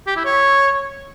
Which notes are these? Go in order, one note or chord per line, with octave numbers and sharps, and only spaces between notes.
G4
E4
C#5